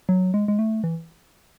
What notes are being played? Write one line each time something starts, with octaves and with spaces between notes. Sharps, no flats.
F#3
G#3
G#3
A3
E3